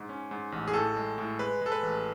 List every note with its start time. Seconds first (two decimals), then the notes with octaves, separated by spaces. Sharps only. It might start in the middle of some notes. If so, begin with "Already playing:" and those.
Already playing: G#2
0.09 C#4
0.31 G#2
0.52 A1
0.68 G#4
0.74 A2 A4
0.96 G#3
1.18 A2
1.39 G#3 B4
1.61 G#3 A4
1.72 B4
1.82 A1